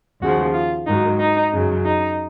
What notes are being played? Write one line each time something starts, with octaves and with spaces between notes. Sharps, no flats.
D#2 C#3 F3 F#4
F4
G#2 D#3 F#3 D#4
D#4
F#2 C#3 F#3
D#4